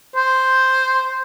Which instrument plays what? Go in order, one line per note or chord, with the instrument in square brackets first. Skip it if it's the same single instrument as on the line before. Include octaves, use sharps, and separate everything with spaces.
[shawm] C5